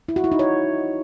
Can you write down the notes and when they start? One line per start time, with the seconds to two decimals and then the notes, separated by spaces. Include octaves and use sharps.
0.08 E4
0.16 F#4
0.24 E4
0.32 D#4
0.39 C#5